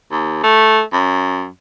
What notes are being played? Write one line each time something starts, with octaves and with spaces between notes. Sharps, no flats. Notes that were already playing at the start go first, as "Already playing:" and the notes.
D#2
A3
F#2